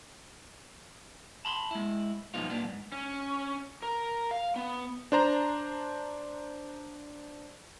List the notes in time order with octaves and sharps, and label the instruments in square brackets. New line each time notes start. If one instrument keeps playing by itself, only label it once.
[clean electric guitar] A5 B5 C6
G#3 E4
G2 B2 F3 B3 D#4 F4
G2 A#2 B3 D4
F2 G#2
[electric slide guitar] C#4
A#4
F5
B3
[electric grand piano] D4 C5 A#5